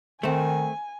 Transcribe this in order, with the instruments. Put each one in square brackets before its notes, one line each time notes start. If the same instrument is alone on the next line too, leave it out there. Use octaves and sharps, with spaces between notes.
[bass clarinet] D#3 [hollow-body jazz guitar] A3 C4 [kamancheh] G#5